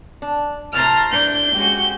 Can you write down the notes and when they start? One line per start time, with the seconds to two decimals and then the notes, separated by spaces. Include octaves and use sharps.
0.22 D4
0.73 A2 C3 A3 A5 A#5 C6 F6
1.12 D4 G6
1.55 G#3 C#4 F#4 G4